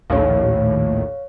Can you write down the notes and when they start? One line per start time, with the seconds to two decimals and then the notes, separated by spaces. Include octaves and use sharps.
0.10 A#1 D#2 A2 C#5 F5